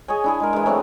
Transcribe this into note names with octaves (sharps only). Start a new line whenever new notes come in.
G#4 C#5 D#5 G#5
D4 E4 G#4
G#3 A#4
E3 G#3
F#3 A3 C4 D4